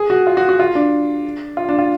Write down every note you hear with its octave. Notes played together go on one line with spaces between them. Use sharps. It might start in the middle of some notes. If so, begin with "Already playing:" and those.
Already playing: G#4
F#4
F4
F#4
F#4
F4
D4
F4
D4
F4